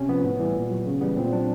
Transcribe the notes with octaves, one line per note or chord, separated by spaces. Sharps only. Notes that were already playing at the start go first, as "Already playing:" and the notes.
Already playing: C3 C#4
F3 B3
A2
E3 G3
A#2
F#3
C#3
E3 G3 B3
A#2 C4
F#3 D4